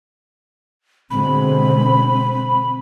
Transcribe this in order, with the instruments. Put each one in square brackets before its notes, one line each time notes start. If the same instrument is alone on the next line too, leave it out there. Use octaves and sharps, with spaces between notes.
[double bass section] B2 D3 G#3 [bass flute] C4 [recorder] B5